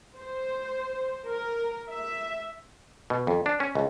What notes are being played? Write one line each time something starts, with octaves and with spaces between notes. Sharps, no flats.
C5
A#4
E5
B2
F2
D4
C#4
C#2